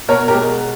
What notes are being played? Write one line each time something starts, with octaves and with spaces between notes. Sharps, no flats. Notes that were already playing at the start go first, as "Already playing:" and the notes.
B2 A#4 C#5
G4 A#4
G#3